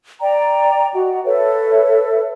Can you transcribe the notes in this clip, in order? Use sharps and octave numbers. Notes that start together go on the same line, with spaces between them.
D5 G5 A#5
F#4 D#5 F#5
A4 B4 C#5 E5